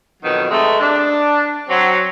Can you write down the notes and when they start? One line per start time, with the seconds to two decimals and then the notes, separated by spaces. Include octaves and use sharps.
0.23 F2 B2 D#3 F#3
0.50 C3 G#3 A3
0.81 D4
1.69 F#3 C4